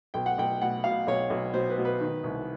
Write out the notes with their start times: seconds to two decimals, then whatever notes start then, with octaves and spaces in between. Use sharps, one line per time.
0.14 B1 G5
0.26 F#5
0.38 B1 G5
0.61 B2 F#5
0.84 B2 F5
1.07 B1 C#5
1.30 B1
1.54 B2 C5
1.70 B4
1.78 B2
1.85 B4
2.01 D#3
2.24 C2